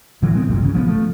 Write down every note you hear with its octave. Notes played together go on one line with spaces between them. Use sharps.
A2 D3 E3 F#3
F3 G#3 B3 C4
F#1 C2 G2 A#2
G#1 C#3
F3 A#3 B3
F3 A3